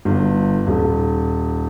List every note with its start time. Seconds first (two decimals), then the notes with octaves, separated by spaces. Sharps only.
0.05 G1
0.67 D#1